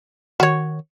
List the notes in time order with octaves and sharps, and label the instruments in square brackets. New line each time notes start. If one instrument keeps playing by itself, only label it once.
[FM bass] D#3 [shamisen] F#4 C#5